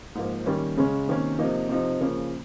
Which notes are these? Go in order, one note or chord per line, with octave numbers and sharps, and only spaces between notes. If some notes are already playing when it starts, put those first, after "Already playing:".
G#2 F3 A#3
D#3 G3 A#3 C#4
C#3 G#3 C#4
C3 D#3 A#3 C#4
C3 F3 A#3 D#4
C3 F3 C4 D#4
C#3 F3 A#3 C#4